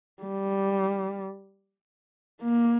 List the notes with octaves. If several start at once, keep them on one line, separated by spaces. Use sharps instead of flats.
G3
A#3